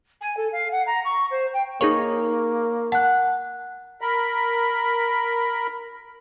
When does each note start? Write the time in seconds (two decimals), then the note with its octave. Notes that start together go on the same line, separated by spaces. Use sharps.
0.20 G#5
0.36 A4
0.52 F5
0.71 F#5
0.86 A#5
1.04 C#6
1.30 C5
1.53 G5
1.81 A#3 D#4 G#4 C#5 C#6
2.92 F#5 A5 F#6
4.01 A#4 B5